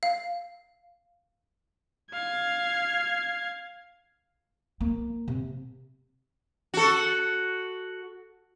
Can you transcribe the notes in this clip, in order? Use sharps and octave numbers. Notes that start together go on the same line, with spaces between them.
F5
F5 G#6
A#3
C3
F#4 A4